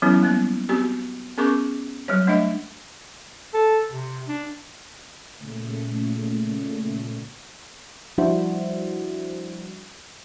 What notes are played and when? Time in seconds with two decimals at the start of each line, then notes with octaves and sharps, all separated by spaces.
0.02 E3 F#3 B3 C#4 E4
0.23 G3 A#3 B3
0.69 B3 C4 F#4 G4 G#5
1.38 B3 C#4 G#4 A#4 C#6 D6
2.08 F#3 G3 C#5
2.27 A3 D4 D#5 E5
3.54 A4
3.89 C3
4.28 D4
5.38 A#2 C#3 A3
8.18 F3 G3 D4 E4 F#4 C5